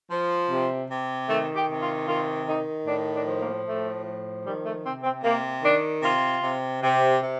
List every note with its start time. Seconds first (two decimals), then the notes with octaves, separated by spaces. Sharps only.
0.09 F3
0.49 C3
0.89 C3
1.28 D#3 A3
1.54 G4
1.68 C3
1.81 F4
2.06 D#3 F4
2.46 D#3 D#4
2.85 A2 D4
3.13 D4
3.26 F3
3.39 A#3
3.65 A2 A3
4.04 F3
4.44 D#3 G3
4.64 A3
4.83 C3 C4
5.03 C4
5.22 C3 A#3
5.63 D#3 D4
6.02 C3 F4
6.41 C3
6.82 C3
7.21 C3